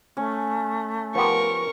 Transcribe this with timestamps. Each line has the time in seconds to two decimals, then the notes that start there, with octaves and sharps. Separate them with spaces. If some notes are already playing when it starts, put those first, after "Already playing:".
0.17 A3 C#4
1.15 F3 B3 G4 A#4 C#6